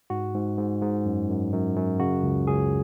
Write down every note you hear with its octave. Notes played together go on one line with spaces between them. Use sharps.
G#2 F#4
G#2
G#2
G#2
F#2
F#2
F#2
F#2
C#3 F#4
C#2
C#2 G#4